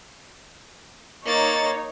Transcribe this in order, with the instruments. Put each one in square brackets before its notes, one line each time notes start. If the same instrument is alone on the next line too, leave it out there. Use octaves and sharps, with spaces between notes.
[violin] A#3 A6 [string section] D#4 C#5